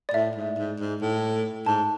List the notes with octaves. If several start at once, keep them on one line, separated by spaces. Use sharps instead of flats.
D5
A2 E5
G#2
G#2
G#2
A2
G#2 A5